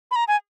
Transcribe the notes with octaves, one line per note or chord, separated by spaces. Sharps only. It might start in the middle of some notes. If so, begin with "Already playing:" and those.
B5
A#5
G#5